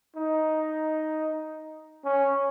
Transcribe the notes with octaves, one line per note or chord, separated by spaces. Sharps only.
D#4
C#4